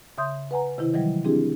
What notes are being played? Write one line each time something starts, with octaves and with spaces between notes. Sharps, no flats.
C#3 E5 C6 D#6 G6
B4 F#5 G#5 A#5
C3 D#3 E4
D#3 E3 F#3 G3
C4 D4 E4 G4 G#4